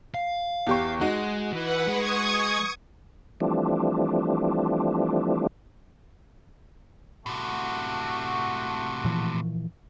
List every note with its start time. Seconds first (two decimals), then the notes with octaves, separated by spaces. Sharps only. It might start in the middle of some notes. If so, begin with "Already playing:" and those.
0.14 F5
0.67 E2 G4 C#6
1.01 G#3 D#4 F#4
1.53 E3 B4 F#5
1.87 G#3 C#6 D#6 G#6
3.40 E3 F3 G3 A3 C4 D4
7.26 A2 C3 A3 F#4
9.05 A#2 E3 F3